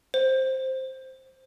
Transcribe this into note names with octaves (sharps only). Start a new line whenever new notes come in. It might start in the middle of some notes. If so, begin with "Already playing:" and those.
C5